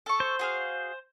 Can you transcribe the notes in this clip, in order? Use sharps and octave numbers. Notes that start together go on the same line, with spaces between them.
A4 C#6
C5
F#4 G#4 F5